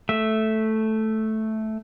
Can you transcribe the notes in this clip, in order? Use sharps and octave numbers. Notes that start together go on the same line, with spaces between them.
A3 E5